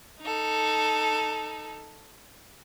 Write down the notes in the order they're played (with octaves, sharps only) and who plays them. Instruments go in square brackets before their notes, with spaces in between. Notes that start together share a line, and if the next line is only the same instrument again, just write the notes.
[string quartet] D#4 A4